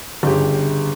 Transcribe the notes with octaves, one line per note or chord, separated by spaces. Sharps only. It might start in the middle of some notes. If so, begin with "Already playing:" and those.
G1 C#3 G4